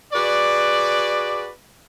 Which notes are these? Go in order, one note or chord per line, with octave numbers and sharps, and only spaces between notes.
F#4 G#4 B4 D5